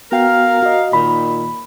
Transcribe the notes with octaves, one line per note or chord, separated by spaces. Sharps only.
B3 F#4 A#4 F5 G5
F#4 D#5
A#2 D#3 B5